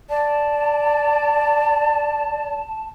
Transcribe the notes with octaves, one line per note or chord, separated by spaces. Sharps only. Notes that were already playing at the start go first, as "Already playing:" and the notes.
D5 A5